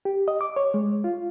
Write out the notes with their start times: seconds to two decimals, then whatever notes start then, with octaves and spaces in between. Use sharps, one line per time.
0.05 G4
0.28 D#5
0.41 D6
0.56 C#5
0.74 G#3
1.04 F4